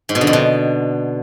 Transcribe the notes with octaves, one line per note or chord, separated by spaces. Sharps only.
G#2
B2
D3
F2
B2